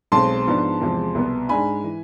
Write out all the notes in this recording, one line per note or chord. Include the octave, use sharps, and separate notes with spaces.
B1 B2 G#3 C4 A5 C6
G#2 F3 B3 D4
E2 C3 F3 G#3
C2 B2 B3
G#2 G#3 D4 G#5 B5
E3